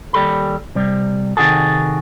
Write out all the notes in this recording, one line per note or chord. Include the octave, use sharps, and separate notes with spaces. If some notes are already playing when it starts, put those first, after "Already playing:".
D#2 G3 A4 B5
C3 G3
C3 D#3 F#4 G#4 A4